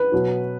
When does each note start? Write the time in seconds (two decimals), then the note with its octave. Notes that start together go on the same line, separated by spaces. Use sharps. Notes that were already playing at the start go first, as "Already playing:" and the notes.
Already playing: B4
0.12 B2 F#3